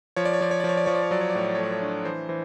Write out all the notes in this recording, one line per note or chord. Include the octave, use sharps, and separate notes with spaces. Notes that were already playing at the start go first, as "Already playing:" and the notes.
F3 C#5
D5
C#5
F3 D5
C#5
D5
F3 C#5
D5
F3 C#5
D5
C#5
F#3 D5
C#5
D5
A2 C#5
D5
A3 C#5
D5
C#5
D4
E3 C5
E3 C5